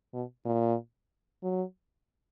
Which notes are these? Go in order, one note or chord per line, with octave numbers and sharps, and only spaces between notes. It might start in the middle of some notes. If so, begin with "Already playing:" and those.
B2
A#2
F#3